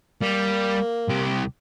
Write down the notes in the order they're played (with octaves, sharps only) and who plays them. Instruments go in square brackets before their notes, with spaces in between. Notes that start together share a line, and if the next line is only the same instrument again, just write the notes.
[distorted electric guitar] G3 [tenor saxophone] A#3
[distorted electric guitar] C2 G4